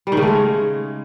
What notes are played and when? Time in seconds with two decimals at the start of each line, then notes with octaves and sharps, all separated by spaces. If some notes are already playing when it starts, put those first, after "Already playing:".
0.07 G3
0.12 D#3
0.17 C#3
0.22 A3
0.28 G#3